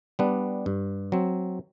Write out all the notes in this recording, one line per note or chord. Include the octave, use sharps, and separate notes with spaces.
G3 B3 D4
G2
F#3 C4